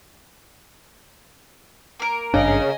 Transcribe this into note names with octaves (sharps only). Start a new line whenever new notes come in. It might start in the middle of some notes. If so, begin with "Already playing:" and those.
A#3 A#4
G#1 G2 C#3 D4 D#5 G#5